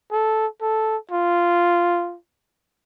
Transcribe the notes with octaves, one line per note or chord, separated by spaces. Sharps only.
A4
A4
F4